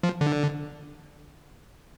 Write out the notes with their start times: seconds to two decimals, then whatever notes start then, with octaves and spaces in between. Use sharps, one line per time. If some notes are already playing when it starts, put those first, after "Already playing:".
0.03 F3
0.21 D3